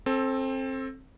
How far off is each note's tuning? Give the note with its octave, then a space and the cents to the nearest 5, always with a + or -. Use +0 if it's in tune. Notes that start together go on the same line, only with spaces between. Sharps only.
C4 +20 A4 -10